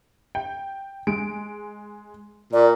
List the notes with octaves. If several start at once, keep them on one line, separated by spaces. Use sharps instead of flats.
G5
G#3 D7
A#2 D5